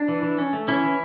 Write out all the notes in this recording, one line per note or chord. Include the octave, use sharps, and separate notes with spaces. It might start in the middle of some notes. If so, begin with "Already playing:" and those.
Already playing: D4
E3
E3
C#4
A3
E3 C#4 E4
E3